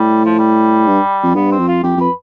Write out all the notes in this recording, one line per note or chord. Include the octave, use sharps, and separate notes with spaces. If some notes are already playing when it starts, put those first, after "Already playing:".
Already playing: A2 G3
F3
G3
G2
F2
G2 B3
C4
F2
F4
F2 G4
F2 B4